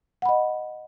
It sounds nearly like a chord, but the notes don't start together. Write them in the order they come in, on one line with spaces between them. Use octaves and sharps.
F#5 B5 D#5